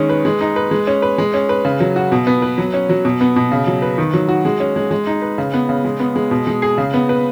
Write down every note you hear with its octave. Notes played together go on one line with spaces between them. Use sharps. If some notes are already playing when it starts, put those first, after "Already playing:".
Already playing: D#3 G#3 C#4
B4
G#3
D#4
B4
G#3
C#4
B4
G#3
C#4
B4
C#3
F#3
F#4
B2
B3
B4
F#3
C#4
F#3
B2
B3
B2
C#3
F#3
B4
D#3
F#3
F#4
G#3
C#4
G#3
G#3
D#4
B4
C#3
B3
C#3
G#3
B3
G#3
B2
G#3
G#4
C#3
B3
B4